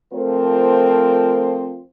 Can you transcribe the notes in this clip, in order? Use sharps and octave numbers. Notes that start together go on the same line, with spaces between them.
F3 A3 C4 F4 A#4 C5